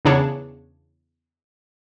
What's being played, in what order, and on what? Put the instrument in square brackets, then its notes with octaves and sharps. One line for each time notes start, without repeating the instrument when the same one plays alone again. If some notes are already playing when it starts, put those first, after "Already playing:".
[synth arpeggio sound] E2 C#3 D4 G#4 C#5 A5